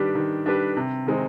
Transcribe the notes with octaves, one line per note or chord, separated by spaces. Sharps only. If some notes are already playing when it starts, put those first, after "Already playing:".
Already playing: D#3 G3 D4 G4 B4
D#3
G3 D4 G4 B4
C3
D#3 G#3 C4 D#4